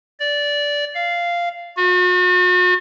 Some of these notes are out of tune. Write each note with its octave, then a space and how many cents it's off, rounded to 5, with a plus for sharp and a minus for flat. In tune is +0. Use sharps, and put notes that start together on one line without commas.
D5 -15
F5 -10
F#4 -40